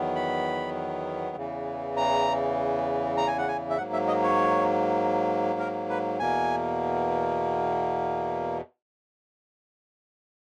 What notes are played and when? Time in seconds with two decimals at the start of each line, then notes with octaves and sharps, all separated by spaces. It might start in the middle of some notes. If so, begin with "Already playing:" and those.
Already playing: E2 D#3 F#3 B3
0.15 B5
1.36 E2 C#3 E3
1.97 A#5
3.17 A#5
3.27 G#5
3.38 F#5
3.48 G#5
3.70 E5
3.78 G#2 F#3 A#3 F#5
3.93 E5
4.08 D#5
4.23 C#5
5.59 A#4
5.89 B4
6.19 E2 B2 A#3 G#5